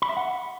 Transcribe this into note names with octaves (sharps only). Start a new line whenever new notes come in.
B5
E5
F#5